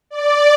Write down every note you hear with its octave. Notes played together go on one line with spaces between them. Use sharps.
D5